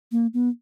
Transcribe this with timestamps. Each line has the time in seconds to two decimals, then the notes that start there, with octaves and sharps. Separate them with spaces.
0.12 A#3
0.34 B3